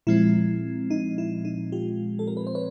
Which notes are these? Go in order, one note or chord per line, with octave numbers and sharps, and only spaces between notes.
A#2 F3 G#3 C4 E4
D#4
E4
D#4
F4 G4
A4
A#4
B4
C5
B4 C#5